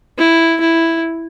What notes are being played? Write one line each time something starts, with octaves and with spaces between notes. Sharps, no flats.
E4
E4